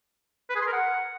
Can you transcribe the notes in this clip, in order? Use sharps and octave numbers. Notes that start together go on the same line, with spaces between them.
B4
G#4
C6
A#4
F#5